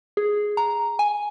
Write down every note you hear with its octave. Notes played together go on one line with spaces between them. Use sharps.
G#4
A#5
G#5